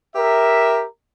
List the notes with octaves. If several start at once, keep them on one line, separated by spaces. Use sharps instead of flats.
G4 A#4 E5